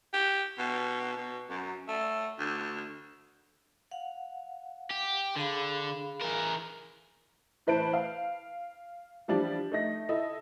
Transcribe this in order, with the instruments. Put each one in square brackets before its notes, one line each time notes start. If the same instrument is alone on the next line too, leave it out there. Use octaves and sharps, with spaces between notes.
[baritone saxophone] G4
B2
B2
F#2
A3
D2
[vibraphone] F5 F#5
[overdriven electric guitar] G4
[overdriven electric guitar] D3 [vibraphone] G#4 F5 B5
[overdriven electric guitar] E3 A#4
[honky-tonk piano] A2 E3 B4 C5 A5 D7
F5
E3 F3 G3 D4
A3 D#4 A#6
E4 A4 D#5